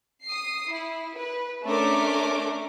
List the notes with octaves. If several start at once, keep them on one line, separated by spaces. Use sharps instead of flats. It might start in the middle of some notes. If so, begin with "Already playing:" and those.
D#6 C7
E4
B4
A3 C#4 D4 A#4 D6